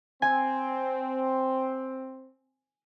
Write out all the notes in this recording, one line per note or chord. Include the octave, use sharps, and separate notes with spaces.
C4 G#5